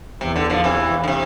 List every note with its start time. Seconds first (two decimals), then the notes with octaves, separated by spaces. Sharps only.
0.21 E2 C3
0.36 D3
0.50 D3 F3
0.64 C3 E3
1.04 D3
1.08 C3